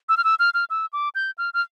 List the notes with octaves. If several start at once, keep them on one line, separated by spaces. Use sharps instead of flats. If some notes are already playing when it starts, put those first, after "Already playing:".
E6
F6
E6
F6
F6
E6
D6
G6
F6
F6